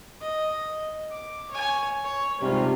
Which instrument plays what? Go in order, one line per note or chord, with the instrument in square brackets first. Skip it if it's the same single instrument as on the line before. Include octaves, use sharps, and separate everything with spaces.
[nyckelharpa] D#5
D6
C#5 G#5
C#5
[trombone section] G#2 C3 G3 [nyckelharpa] C#4 F4